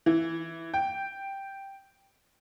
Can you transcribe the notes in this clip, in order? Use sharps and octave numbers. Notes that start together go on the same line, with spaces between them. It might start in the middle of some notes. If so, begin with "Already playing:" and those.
E3
G5